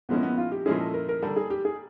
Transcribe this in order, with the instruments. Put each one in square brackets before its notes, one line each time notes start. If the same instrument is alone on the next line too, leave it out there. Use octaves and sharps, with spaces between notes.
[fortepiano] A#2 F3 G#3 C#4 E4 [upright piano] B3
[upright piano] B3
F4
G4
[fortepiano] A#2 F3 G#3 C#4 E4 [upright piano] G#4
[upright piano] A4
A#4
A#4
[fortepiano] D3 G3 A#3 D4 [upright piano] A4
[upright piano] G#4
G4
G#4